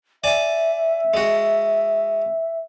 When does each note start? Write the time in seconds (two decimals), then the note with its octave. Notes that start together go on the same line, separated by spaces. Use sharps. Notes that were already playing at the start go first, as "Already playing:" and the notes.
0.24 D5 E5 G#5 A5
1.14 G#3 F#4